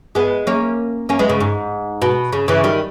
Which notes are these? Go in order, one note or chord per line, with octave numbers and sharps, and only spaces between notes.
G#3 B3
A#3 C#4
A#3 C#4
G#3 B3
C#3
G#2
B2
C#3
C#3 E3
D#3 G3